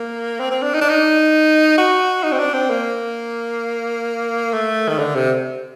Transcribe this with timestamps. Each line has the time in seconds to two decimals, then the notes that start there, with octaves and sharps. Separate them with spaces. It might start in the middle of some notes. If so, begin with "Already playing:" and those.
Already playing: A#3
0.40 C4
0.51 C4
0.62 D4
0.74 D#4
0.81 D4
0.89 D#4
1.78 F#4
2.24 D#4
2.32 C4
2.39 D4
2.54 C4
2.70 A#3
4.54 A3
4.89 D#3
4.99 D3
5.15 C3